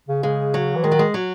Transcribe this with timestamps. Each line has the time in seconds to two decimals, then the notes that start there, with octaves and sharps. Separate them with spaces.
0.09 C#3
0.23 C#3 G#3
0.54 F#3
0.75 E3
0.83 D#3 G#3
0.92 F#3
0.99 G#3
1.14 F#3